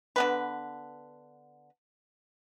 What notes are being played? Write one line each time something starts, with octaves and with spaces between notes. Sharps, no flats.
D3 B3 B4